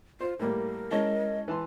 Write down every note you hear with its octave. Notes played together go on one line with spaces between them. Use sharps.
F4 C5
A2 G3 A#3 A#4
G#3 C#4 E4 D#5 A5
E3 A5 C6